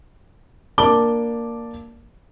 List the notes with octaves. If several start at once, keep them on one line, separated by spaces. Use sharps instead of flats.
A#3 D4 A5 D6 G7